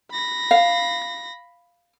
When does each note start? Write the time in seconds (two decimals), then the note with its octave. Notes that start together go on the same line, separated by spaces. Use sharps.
0.12 B5 A#6
0.51 F5